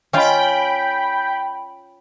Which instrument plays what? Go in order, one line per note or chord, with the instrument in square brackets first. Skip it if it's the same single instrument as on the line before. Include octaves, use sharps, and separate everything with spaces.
[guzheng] C#4 F4 F5 [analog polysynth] G5 B5